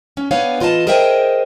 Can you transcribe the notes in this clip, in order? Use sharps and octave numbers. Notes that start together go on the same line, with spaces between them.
C#4
B3 D4 C#5 F5 G#5
E3 F4 A4 D#5 A5
G#4 A#4 C5 D#5 E5 G5